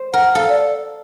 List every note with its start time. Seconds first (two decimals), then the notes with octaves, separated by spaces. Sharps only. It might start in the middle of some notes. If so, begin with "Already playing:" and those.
Already playing: C5
0.14 A#4 F#5
0.35 A4 F5
0.49 D5